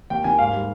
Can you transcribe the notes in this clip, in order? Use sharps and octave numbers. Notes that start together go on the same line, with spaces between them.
D#2 G5
D#3 G#5
G#2 F5
G3